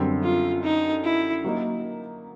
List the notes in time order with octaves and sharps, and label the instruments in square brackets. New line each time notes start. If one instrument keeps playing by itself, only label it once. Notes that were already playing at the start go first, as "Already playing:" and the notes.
Already playing: [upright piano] F#2 D3 G3 C4
[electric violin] F4
D#4
E4
[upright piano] F#3 A#3 D#4